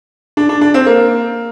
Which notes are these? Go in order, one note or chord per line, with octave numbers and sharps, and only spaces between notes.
D4
D4
D4
C4
A#3